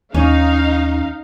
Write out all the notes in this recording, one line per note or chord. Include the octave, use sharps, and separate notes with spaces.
D#2 C#4 D#4 F5